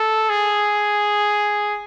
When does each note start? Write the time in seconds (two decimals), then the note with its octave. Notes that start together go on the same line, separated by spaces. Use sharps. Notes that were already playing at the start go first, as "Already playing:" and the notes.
Already playing: A4
0.30 G#4